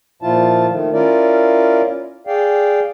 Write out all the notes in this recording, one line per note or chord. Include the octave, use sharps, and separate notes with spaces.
A#2 F3 E4 F4 A5
D#3 A3
C#4 E4 F4 A#4 D5
G#4 D5 F5 G5